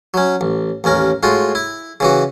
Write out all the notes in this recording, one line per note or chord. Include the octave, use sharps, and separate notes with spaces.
F#3 C#4
A1
A1 D#2 C#4 A#4
A2 G#3 F4 F#4
E4
C#3 E3 F#4